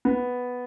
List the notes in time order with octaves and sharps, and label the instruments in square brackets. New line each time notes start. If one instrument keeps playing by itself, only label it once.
[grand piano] B3